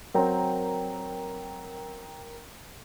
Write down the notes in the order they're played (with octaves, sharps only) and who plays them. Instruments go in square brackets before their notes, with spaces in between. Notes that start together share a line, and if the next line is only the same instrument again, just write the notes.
[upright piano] F#3 C4 [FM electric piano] A#4 G5 A#5